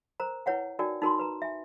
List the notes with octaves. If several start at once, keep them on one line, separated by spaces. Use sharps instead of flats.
A#4 C5 A#5
E4 B4 C#5 F#5 G5
D#4 F#4 A#4 D5 G5 G#5
D#4 F#4 A#4 G#5 B5 C6
B4 A#5
E5 G#5